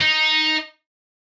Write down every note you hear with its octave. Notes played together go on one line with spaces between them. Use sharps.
D#4